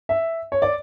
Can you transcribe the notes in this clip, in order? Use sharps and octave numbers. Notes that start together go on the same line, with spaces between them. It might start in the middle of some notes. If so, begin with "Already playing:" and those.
E5
C#5
D5